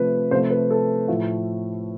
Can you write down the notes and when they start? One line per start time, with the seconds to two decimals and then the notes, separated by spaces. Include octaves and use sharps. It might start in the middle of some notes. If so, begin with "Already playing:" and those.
Already playing: C3 F3 A3 B4
0.31 C3 F3 A3 C5
0.50 B4
0.70 A4
1.08 A2 F3 A3